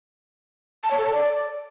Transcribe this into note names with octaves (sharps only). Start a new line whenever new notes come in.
A5
C#5
A4
A5
D5